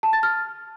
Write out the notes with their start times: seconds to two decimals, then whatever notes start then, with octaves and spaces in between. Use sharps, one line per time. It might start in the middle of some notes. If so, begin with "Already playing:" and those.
0.03 A5
0.13 A6
0.23 F6